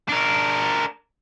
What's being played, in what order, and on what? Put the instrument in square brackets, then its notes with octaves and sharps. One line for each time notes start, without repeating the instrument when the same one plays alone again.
[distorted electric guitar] D4 A#4